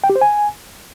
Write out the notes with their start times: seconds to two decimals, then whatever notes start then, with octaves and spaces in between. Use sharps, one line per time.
0.04 G5
0.10 G4
0.16 C5
0.21 G#5